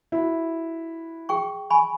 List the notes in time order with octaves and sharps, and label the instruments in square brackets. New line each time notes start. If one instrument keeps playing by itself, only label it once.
[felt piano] E4 F#4
[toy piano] G#4 G5 C#6
G#5 B5 C#6